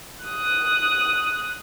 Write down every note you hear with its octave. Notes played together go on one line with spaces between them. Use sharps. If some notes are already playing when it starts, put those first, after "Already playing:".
D#6 F#6